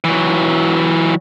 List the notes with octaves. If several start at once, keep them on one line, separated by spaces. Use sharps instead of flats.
E3 F#3